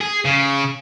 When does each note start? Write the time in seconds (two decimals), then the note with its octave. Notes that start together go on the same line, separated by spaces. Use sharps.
0.01 G#4
0.25 C#3